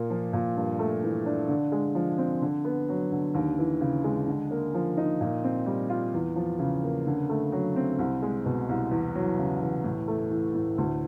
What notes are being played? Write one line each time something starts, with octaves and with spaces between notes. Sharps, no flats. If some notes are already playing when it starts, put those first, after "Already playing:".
Already playing: A#2 A#3
F3
A#2
G2
A3
E3
D4
D3
G#3
F3
C4
D3
B3
F#3
D3
D#2
E3
C#3
G#3
D3
A#3
F3
D#4
A#2
C4
G3
F4
E2
F3
C#3
A#3
D3
A3
F#3
C4
C2
G#3
B2
C2
E2
F#3
C#3
E2
A2
A3
E3
A2
D2